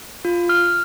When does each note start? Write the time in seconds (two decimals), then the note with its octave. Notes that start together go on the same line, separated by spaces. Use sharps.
0.25 F4
0.49 F6